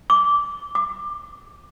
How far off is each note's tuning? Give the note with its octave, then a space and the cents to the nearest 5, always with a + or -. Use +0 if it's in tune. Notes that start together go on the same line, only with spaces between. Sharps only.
D6 -15
D6 +20